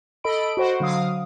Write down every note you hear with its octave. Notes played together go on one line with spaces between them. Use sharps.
A4 D#5 B5 D7
F#4 C5 F#5
D3 F#3 F5 D#6